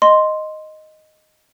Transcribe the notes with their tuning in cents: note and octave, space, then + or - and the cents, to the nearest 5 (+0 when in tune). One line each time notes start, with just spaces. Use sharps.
D#5 +0 C6 +0